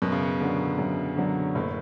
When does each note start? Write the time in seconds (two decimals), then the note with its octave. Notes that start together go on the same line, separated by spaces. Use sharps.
0.02 F#2 B2
0.12 C#3
0.23 B2
0.41 D3 F#3
0.79 F#2
1.17 D3 F#3
1.55 F#1 A2